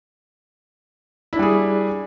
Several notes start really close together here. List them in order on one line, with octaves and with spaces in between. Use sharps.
E4 D4 G3 G#4